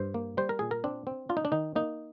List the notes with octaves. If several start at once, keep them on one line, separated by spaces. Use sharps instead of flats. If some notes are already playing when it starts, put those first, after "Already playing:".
Already playing: G2 C5
A#3
G3 C5
A#4
A#2 G#4
A#4
C4 D4
C4
D4 F4
D#4
D4
D#3 D#4
A#3 D#4